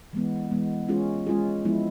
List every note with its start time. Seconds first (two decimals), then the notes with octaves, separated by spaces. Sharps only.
0.13 E3 G#3 B3
0.51 E3 G#3 B3
0.88 G#3 C#4 F4 G#4
1.27 G#3 C#4 F4 G#4
1.65 F3 G#3 B3 E4